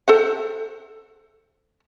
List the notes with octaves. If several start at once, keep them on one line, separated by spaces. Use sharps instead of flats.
A4 C5 F#5